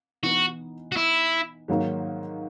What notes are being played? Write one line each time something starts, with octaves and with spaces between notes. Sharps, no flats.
E3 B3 D#4 F#4
F#4
E4
G#2 D#3 F#3 A#3 D#4